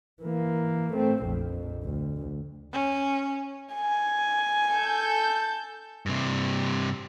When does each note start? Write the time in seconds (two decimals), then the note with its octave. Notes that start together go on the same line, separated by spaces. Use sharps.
0.22 E3 A#3
0.94 A3 C4
1.24 A#1 F2
1.84 D2
2.72 C#4
3.74 G#5
4.72 A4 G6
6.06 G2 C3